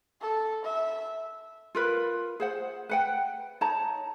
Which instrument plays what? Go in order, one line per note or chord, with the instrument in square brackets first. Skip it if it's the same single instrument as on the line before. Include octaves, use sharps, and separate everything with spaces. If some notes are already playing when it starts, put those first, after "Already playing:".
[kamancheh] A4
E5
[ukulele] F4 A#4 B4
G#4 C5 F#5
B4 F#5 G5
D#4 C#5 A5 A#5